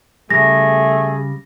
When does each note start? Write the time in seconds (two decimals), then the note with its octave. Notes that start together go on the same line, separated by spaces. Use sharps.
0.31 C#3 G3 A3 G#4 A#6